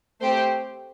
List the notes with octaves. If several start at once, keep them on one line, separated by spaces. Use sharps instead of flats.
A3 C4 G4 C5